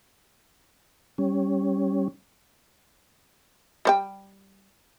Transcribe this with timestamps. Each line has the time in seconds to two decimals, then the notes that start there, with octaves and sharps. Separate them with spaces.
1.18 G3 C#4
3.85 G3 C5 G5